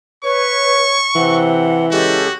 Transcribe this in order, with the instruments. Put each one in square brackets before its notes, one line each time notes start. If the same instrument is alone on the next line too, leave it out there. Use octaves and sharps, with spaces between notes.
[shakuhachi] B4 [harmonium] C#5 [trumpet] C#6
[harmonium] C3 C4 [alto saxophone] E3 [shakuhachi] F#5
[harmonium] C#3 G#3 A4 [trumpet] F#4 [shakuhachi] G4